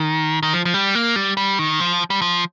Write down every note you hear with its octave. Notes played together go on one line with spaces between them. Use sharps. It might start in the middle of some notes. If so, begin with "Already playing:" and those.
Already playing: D#3
D#3
F3
F3
G3
A#3
G3
G3
D#3
F3
G3
F3